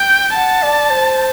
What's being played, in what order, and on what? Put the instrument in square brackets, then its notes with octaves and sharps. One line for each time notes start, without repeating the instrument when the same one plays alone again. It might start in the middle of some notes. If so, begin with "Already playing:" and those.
Already playing: [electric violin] G5
[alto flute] F#5 [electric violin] A5
[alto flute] D5
C5